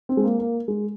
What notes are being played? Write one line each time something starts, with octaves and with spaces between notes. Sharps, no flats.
C4
G#3
A#3
A#3
G#3